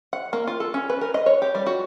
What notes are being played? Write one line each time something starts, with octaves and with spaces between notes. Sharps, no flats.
F#5
A#3
F4
A4
C#4
B4
A#4
D#5
C#5
G4
G3
F#4